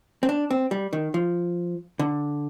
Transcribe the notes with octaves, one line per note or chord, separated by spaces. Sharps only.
C4
D4
C4
G3
D#3
F3
D3